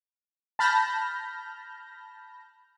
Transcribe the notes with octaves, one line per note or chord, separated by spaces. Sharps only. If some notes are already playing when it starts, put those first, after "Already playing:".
A5 B5 F6 G6 A#6